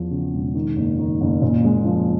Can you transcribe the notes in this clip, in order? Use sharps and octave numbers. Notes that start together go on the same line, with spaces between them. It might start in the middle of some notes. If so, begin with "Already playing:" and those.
Already playing: E2 F3
C#3
E1
D#3
F#1
D#3
F#1
A#2
G#3
F3